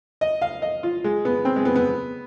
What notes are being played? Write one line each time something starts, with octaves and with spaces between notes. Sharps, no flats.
D#5
F5
D#5
F4
G#3
B3
C4
G#3
B3
B3